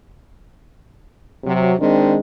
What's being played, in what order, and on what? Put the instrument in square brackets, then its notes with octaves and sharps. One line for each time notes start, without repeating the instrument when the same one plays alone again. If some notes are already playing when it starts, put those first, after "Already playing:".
[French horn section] C3 F#3
D#3 G#3 C4 D4